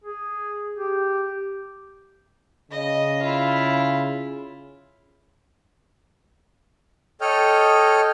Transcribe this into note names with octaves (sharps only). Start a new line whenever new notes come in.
G#4
G4
C#3 D#5
E4 F4
A4 C#5 D#5 G5 F6